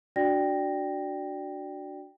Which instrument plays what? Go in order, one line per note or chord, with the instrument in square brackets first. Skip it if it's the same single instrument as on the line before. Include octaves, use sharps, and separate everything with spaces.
[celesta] D4 F#4 D5 G5 A#6